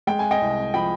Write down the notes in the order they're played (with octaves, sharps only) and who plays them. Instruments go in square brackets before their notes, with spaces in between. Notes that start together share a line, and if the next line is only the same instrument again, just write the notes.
[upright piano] G#3 G5
G#5
D#5 G5
C2
F3 G5 B5